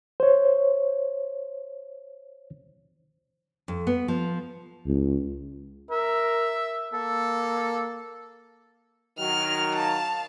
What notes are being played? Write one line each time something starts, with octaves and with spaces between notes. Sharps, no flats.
C5 C#5
F2
B3
F3
C#2
A#4 E5
A#3 A4
D#3 F#3 F6
F5 A5